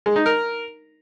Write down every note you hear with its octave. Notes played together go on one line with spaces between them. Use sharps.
G#3
D#4
A#4